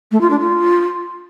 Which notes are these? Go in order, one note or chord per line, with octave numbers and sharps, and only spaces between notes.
A3
F4
D4
F4